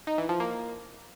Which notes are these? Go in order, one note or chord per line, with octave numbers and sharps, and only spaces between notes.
D#4
E3
F3
A#3